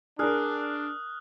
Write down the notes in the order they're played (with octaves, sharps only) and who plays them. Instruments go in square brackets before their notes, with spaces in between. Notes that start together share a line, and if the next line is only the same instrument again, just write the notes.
[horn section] D4 [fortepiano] G#4 A#4 [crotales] D#6 F6 F#6